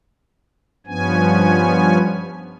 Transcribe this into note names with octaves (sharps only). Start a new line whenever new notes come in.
G2 F3 B3 C#4 G#5